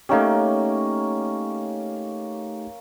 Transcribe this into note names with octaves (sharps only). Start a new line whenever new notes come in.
A3 A#3 C#4 D#4 G4